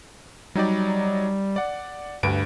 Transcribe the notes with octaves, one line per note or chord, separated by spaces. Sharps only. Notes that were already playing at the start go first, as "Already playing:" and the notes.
F#3 G3 D#4 D5
D5 F#5
D2 G2 B4 D7